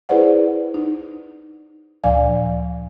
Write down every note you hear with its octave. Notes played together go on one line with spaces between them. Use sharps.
E4 G#4 B4 C5 D5 F#5
D#4
D2 A#2 F3 D5 F5 G#5